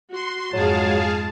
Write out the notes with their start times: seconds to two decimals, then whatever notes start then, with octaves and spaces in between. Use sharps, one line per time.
0.13 F#4 C6
0.53 F2 G#2 F#3 G#3 G#4 F5 A5